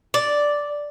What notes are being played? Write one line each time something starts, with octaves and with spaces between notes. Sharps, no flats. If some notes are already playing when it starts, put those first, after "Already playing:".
D5